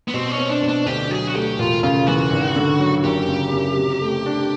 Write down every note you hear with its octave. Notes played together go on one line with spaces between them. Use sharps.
B3
B2 C4
C#4
C4
D4
B2
D4
D2 G4
F#3 G#4
F#4
A3 G4
E1 F4
C#3 F4
E3 F#4
G#1
D3
F#3
F#1 G4
C#3
F#1
C3
A3
D4